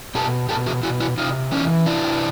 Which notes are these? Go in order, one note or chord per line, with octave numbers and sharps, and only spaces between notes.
B2 G4 A4
B2 G4 A4
F#4 G#4
B2 E4 F#4
E4 F#4
C3 D#4 F4
E3 C#4 D#4
C3 D4 E4